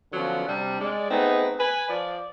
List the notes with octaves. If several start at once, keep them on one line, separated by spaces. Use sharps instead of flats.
D3 F3 F#3 B3 C#4 F4
C3 G3 D4
G#3 D5
A3 B3 C4 D#4 G#4 B4
B4 G#5
F3 D5